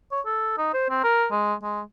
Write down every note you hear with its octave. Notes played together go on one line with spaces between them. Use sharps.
C#5
A4
D#4
C5
C4
A#4
G#3
G#3